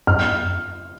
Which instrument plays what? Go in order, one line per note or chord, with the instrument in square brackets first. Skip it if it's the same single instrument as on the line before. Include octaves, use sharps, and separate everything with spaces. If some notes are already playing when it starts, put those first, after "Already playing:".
[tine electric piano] F#2 [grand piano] F6